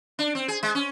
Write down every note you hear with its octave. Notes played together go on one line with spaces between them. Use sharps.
D4
C4
G#4
G#3
C#4